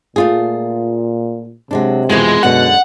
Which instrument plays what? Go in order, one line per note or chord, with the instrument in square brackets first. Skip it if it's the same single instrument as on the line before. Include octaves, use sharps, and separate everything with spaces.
[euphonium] A#2 [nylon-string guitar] A3 F4 G#4
[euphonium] C3 [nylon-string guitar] F#3 G#3 D4
[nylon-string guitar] F2 B2 E3 [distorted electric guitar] G#3
[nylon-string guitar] F#2 D3 G#3 [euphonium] B2 [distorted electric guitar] F#5